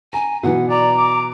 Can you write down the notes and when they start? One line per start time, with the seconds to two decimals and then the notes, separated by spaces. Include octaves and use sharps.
0.13 G#5 A#5
0.43 B2 E3 F#3 F#5
0.70 D5 A#5
0.98 D6